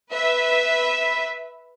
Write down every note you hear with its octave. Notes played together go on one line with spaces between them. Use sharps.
B4 E5